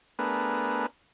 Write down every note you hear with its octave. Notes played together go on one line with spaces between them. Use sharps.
A3 B3 D4 G#4 A#4 B4